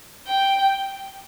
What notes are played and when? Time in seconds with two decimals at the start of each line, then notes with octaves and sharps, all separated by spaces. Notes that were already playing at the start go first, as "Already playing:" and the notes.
0.27 G5